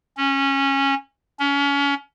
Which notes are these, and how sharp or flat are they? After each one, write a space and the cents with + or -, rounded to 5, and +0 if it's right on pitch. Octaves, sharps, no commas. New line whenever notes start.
C#4 -15
C#4 +30